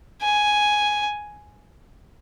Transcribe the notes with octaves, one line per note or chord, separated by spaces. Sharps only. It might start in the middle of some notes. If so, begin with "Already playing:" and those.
G#5